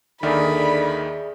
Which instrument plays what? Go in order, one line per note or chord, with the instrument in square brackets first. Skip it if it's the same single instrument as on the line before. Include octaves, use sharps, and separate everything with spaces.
[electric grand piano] D#2 D#3 [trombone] D3 [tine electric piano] G#4 D5 E5 [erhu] B5